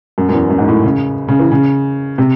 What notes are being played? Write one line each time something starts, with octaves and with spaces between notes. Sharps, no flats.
F#2
F#2
E2
F#2
G#2
A2
C#3
C#3
E3
C#3
C3